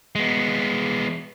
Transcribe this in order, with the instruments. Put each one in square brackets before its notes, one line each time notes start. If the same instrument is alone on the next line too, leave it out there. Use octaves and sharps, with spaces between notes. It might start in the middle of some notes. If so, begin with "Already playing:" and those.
[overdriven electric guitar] G#3 B3